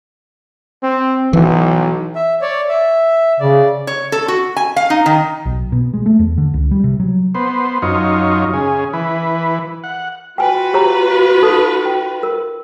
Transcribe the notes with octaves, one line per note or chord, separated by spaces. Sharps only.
C4
B1 E3
E5
C#5 D5
E5
C#3 D5
C#5
A4
F#4
G#5
F5
D#4
D#3
B1
B2
G#3
A3
E2
D3
C#2
G3
C3
F#3
B3 C5
F#2 D#4 F4 C#5
C#3 G#4
E3 B4
F#5
F4 F#4 B4 G5 G#5
G4 C#5 A#5
D#4 A4
G5
A#4